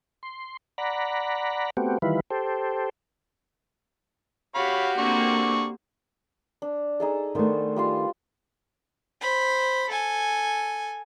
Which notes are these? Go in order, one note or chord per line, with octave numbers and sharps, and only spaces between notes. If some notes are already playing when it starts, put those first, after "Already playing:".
C6
D5 F#5 A#5 B5
A3 B3 C4 F#4 G4
D#3 E3 G3 E4 F4 B4
G4 A4 C5
F#4 G4 C#5 F5 B5
D3 A#3 C4 D5 C#6
D4
D#4 G#4 A4
D#3 A3 B3 D4 C5
G3 F4 C6
C5 B5
A4 G#5